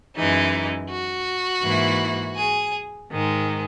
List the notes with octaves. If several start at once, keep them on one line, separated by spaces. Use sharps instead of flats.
F#2 E3 G#3 D#4
F#4
G#2 E3 A#3 E4
G#4
G#2 D#3 G#3